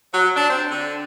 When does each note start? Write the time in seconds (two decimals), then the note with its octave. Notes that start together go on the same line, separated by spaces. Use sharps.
0.14 F#3
0.35 D4
0.49 C4
0.70 D3